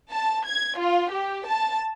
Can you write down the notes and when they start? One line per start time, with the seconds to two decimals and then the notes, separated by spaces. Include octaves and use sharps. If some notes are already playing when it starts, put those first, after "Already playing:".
0.11 A5
0.45 G#6
0.78 F4
1.11 G4
1.46 A5